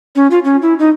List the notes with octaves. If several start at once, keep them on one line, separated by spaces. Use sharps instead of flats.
C#4
F4
C#4
E4
D#4